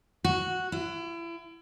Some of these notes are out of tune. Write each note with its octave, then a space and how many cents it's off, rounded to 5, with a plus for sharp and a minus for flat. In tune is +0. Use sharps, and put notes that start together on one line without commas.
F#4 -5
E4 +35